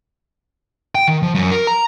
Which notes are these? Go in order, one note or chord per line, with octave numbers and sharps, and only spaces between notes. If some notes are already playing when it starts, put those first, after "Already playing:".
G5
D#3
F3
F#2
A#4
A#5